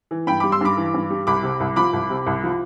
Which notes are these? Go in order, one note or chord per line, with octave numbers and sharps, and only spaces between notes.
E3
G2 G5 B5
G3 B5 D6
C6 E6
G2 B5 D6
E3
G2
G3
C2 B5 D6
C3
C2
F3 B5 D6
C2
C3
C2
F3